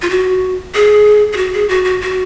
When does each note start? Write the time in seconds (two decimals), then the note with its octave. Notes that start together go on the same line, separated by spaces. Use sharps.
0.02 F4
0.10 F#4
0.75 G#4
1.33 G#4
1.37 F#4
1.54 G#4
1.69 F#4
1.85 F#4
2.01 F#4